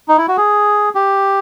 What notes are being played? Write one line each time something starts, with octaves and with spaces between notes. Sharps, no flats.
D#4
E4
F#4
G#4
G4